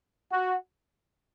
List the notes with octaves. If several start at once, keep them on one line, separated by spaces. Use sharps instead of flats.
F#4